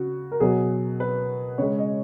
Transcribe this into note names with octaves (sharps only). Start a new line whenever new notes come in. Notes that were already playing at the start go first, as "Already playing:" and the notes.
Already playing: C#3 F#4
A#4
B2 F#3 G#4
B4
C#3 G#3 C#5
D#5